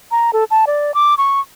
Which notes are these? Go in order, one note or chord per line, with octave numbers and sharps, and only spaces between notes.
A#5
A4
A5
D5
D6
C#6